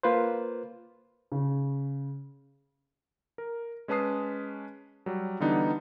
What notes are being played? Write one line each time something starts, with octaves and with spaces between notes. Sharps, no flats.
A#3 F4 B4 C5
C#3
A#4
G#3 C#4 B4 A5 D#6 C7
F#3 G3
D3 E3 G3 B3 D4 D#4